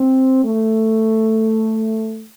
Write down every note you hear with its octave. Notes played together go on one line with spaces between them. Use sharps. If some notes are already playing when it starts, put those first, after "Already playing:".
Already playing: C4
A3